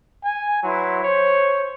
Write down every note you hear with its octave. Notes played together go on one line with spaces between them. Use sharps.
G#5
F#3 E4 B4 C6
C5 C#5